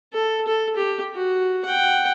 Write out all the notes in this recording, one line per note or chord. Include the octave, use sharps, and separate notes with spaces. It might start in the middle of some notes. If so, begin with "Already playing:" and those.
A4
A4
G4
F#4
F#5 G5